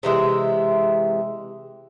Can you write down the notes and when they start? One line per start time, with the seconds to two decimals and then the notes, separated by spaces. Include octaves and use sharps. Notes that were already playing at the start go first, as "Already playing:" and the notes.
0.03 C3 E3 G#3 E5